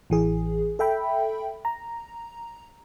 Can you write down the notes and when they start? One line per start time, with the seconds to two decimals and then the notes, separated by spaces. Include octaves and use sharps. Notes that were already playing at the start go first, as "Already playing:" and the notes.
0.10 A1 E3 G#4
0.79 A4 E5 G5 B5
1.65 A#5